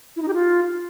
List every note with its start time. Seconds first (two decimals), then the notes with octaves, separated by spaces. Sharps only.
0.16 E4
0.22 D#4
0.28 G4
0.34 F4